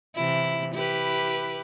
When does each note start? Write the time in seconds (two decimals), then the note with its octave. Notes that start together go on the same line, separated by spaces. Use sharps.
0.16 C3 E3 E4
0.75 E4 G4 B4